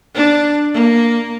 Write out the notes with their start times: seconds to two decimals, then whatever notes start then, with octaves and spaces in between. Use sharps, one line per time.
0.15 D4
0.73 A#3